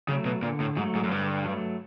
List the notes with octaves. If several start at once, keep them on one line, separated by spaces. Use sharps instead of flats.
C#3 F#3 A3
B2
A#2 D3
A2
G#2 F#3 A3
G#2
F#2
G2 D3
F#3 A3